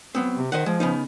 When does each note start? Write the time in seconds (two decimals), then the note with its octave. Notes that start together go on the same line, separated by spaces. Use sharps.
0.15 F#3 B3 C4
0.37 C3
0.52 D#3 C5 D#5 F#5
0.66 F3 G#3
0.80 C#3 B3 D#4